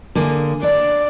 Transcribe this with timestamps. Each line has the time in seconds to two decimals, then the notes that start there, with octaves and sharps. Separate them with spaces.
0.15 D3 A#3 G#4
0.63 D4 D5